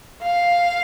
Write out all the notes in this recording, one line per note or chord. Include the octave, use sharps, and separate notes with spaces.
F5